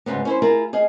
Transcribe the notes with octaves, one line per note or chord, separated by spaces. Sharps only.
D2 G#2 C#3 B3
C#4 E4 C5
E4 F4 G#4 A#4
G#4 D#5 F5